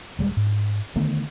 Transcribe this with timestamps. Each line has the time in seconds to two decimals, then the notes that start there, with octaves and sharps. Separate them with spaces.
0.19 D#1 G3 G#3
0.37 G#2
0.96 D3 D#3 A3 B3